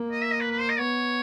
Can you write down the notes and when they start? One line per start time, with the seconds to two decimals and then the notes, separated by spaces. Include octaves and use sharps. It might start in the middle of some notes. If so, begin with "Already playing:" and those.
Already playing: A#3
0.12 D#5
0.22 E5
0.31 D#5
0.41 B4
0.51 B4
0.60 C5
0.69 D#5
0.79 B3 C#5